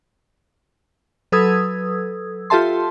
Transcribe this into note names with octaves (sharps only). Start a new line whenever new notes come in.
F#3 A4 B4 D#6 E6 G#6
F4 G4 A4 E5 A5 C6